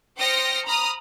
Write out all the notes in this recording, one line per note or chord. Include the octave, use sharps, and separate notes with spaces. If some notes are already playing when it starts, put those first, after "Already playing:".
C5 G5 D#6 F6 A#6 C#7
A#5 B5 D#6 F6